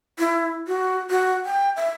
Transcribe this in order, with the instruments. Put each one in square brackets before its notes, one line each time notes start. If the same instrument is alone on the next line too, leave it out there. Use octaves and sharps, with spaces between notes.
[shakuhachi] E4
F#4
F#4
G5
E5